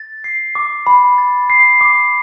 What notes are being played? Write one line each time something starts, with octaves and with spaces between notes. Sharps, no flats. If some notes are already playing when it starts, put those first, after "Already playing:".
Already playing: A6
C7
D6
B5
A6
C7
D6